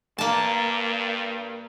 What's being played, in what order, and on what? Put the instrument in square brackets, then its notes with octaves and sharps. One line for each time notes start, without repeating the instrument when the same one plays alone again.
[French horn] G2 [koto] A#3 A5